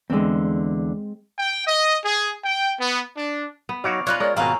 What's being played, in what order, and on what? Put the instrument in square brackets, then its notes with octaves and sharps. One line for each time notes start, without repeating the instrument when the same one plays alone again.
[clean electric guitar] E2 D3 [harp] G#3 C4
[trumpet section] G5
D#5
G#4
G5
B3
D4
[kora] B3
[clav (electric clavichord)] F#3 D#4 F#4 [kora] C#5 D5 F5
[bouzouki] C#4 D#4 B4 [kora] F4 C#5 [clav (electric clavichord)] D5 [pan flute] F#6
[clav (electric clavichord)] G#3 C#5 [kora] A#4 [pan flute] D5
[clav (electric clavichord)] G#1 B2 [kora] C4 C#4 [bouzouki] D#5 F5 F#5 [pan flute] A#5